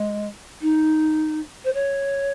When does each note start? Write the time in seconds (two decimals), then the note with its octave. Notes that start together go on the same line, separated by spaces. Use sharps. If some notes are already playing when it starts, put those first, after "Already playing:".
Already playing: G#3
0.61 D#4
1.64 C5
1.73 C#5